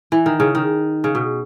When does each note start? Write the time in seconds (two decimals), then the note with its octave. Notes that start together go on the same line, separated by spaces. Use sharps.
0.12 E3
0.26 D#3
0.40 C#3
0.55 D#3
1.04 C#3
1.15 B2